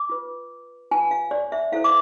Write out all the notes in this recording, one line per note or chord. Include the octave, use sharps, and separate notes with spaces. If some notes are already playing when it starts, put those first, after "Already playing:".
Already playing: D6
F4 B4
F4 B4 G#5
F5
D5
E5
E4 A4 C5 F5
D6